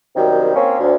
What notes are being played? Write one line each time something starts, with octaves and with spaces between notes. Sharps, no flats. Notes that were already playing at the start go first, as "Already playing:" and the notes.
F#2 C3 D#3 G3
A#3 C4 C#4
D2